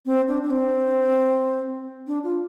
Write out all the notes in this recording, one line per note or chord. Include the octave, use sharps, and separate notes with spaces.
C4
D4
D4
C4
D4
F4